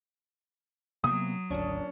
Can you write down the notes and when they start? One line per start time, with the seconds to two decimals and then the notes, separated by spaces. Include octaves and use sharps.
1.04 C3 F#3 A#3 B3 D#6
1.50 G#1 D2 A#2 C#4 D4